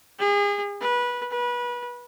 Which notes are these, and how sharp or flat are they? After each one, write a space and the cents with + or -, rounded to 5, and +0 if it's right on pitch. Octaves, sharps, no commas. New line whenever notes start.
G#4 -35
B4 -20
B4 -25